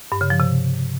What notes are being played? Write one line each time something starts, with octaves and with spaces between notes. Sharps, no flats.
G2
C#3
F3
C3